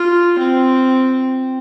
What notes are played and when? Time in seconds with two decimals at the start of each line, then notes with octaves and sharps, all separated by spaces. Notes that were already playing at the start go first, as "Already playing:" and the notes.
Already playing: F4
0.38 C4